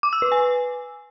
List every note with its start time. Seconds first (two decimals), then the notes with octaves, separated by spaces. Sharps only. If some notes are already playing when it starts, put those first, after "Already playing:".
0.03 D6
0.13 E6
0.22 B4
0.32 G#5